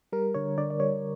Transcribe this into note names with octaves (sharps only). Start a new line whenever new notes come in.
G3 A#4
D3 C#5
D3 D5
D5
G3 C#5